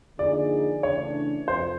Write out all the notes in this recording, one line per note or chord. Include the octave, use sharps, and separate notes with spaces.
D3 F3 A#3 D#4 G#4 D5
C#3 E3 A3 D4 C#5
F2 C3 C5